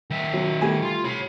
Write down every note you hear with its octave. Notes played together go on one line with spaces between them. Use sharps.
D#3 E5
F#3
G3 A3 G#5
F4
C#5 B5